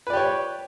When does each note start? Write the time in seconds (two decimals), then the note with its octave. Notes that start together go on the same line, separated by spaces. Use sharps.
0.07 B4
0.10 D5
0.13 G4
0.17 C#5